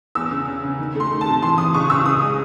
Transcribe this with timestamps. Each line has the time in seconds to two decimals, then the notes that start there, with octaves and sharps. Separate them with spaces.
0.15 E2 E6
0.31 C#3
0.47 C#3
0.63 C#3
0.78 D#3
0.95 A3
1.00 C6
1.11 D#3
1.21 A5
1.26 C3
1.42 E3 C6
1.58 E3 D#6
1.74 C#2 C#6
1.90 C#2 E6
2.06 C#3 D#6
2.21 G#3